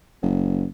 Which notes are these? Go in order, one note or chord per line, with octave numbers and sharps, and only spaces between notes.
F#1